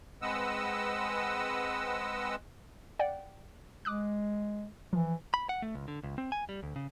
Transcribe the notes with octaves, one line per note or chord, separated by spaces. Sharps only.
G#3 C4 B4 D#5 F#5 E6
D5 F#5 G5
G#3 D6 D#6 F#6
E3 F3
B5
F#5
A3
C#2
D3
C#2
C4
G#5
G3
D2
C#3